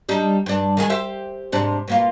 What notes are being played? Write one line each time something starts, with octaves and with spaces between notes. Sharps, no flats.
G3 D4 D#4
G2 D4
D#3 G#3 G#4
G4 C5 E5
G#2 C3 D4
B2 A#3 F4